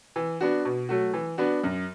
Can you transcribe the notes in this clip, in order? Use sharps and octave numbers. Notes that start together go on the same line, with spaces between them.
E3
B3 D4 F#4
B2
F#3 A3 F#4
E3
B3 D4 F#4
F#2